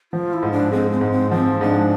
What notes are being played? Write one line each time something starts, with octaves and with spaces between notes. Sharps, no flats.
F3 F4
E4
G#2
D4
G#3 C4
C4
G#2
C4
F3 C4
G#2 D4